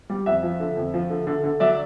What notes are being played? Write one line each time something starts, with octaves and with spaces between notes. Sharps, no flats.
G3
F2 E5 F#5
F3
D3
F2
F3
D3
D3
D3
F#3 D5 E5